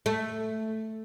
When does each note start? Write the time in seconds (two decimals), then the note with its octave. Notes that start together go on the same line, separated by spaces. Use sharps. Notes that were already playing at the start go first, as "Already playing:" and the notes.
0.06 A3